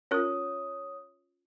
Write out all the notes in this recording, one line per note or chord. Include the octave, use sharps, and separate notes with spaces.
C#4 F4 A#4 C#5 D#6